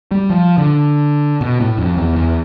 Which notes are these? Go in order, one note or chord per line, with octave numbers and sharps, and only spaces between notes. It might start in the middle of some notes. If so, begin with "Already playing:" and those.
G3
F3
D3
B2
A2
F2
E2
E2